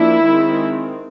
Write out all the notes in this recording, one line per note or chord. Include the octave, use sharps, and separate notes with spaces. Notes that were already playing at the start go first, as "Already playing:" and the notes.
Already playing: F3 A#3 D4 E4
D#3 G#3 C4